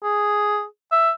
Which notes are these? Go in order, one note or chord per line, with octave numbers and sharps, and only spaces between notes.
G#4
E5